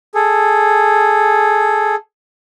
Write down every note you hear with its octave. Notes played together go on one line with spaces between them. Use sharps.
G#4 A4